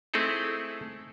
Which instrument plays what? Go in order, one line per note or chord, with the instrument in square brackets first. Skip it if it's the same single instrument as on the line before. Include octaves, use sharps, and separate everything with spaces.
[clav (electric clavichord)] A3 C4 D#4 E4 G#4 A4